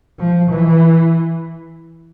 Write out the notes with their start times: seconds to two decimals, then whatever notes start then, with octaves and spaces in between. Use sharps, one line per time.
0.19 F3
0.50 E3